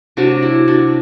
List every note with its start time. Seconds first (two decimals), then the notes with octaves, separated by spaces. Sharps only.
0.17 C3 F#3 A3 D4 F#4
0.42 E4 G4
0.68 D4 F#4